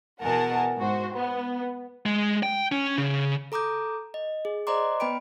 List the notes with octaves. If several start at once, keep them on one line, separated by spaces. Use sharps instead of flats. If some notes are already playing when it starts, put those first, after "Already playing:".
E2 B2 A#4 F#5 G#5 A5
G#2 F#4 C5
B3
G#3
G5
C#4
C#3
A4 A#5 D6 D#6 G6
D#5
G#4
C5 D5 D#5 A#5 C6 D6
B3 B4 G5 B5 D7